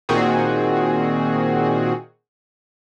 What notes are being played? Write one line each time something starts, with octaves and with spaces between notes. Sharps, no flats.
A#2 D#3 C4 F#4 G#4